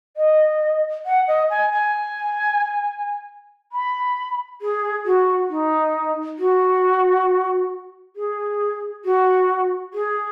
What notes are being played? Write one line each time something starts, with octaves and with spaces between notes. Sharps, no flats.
D#5
F#5
D#5
G#5
G#5
B5
G#4
F#4
D#4
F#4
G#4
F#4
G#4